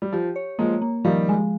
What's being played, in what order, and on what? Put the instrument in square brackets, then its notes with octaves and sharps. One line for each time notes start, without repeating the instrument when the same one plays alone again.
[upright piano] G3
[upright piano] F3 [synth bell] G4
[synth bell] C#5
[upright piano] F3 G#3 [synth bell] A#3
[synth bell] A#3
[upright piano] D#3 G3 [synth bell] F3
[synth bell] G#3